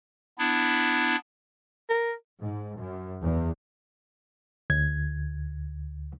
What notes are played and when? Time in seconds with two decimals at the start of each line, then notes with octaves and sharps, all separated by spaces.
0.39 B3 D4 E4
1.89 A#4
2.41 G#2
2.79 F#2
3.22 E2
4.70 D2 G#6